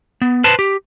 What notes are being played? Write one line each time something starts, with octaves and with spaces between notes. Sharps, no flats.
B3
B4 C5 A5
G4